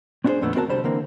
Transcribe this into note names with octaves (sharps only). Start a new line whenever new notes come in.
C4 D4 E4 F4 G#4 C5
F2 A#2 D3 A3 B3
B3 C4 F#4 A#4 F5 A5
C2 D3 G3 C5
D3 E3 A#3 C4